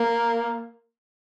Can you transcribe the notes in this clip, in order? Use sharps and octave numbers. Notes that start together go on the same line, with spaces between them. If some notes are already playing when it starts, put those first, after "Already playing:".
Already playing: A#3